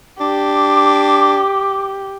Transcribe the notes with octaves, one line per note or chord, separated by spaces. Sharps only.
D4 G4 D6